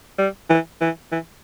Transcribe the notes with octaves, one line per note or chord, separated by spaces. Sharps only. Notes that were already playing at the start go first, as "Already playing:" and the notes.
G3
E3
E3
E3